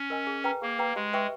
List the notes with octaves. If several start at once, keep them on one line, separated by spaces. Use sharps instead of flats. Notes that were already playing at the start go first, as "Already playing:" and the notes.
Already playing: C#4
A#4 D#5 G#5
G#4
B4 G5 A#5
A#3 G#4
B4 G5 A#5
G#3 G4
B4 E5 G5 C#6